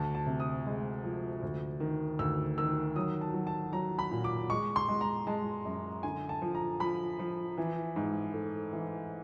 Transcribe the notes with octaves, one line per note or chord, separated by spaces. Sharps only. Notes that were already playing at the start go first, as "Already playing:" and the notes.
Already playing: D2 A5
A5
C3
D#6
G#3
F3
D2
D#3
D2 E6
D#3 E6
F#3 D#6
A5
F#3
A5
F#3 A#5
B5
A#2
D6
G#3 C#6
C6
G#3
A#5
G#3 A5
F#2
D3 G#5
A5
F3
A#5
F3 B5
F3
E3
G#2
A3
E3